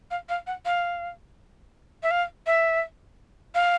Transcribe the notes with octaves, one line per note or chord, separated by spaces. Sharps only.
F5
F5
F#5
F5
E5
F5
E5
F5